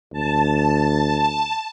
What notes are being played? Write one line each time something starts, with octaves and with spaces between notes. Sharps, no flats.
D2 A5